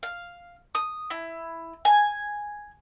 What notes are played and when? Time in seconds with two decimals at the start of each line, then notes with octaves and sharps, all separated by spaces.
0.03 F5
0.75 D#6
1.10 E4
1.85 G#5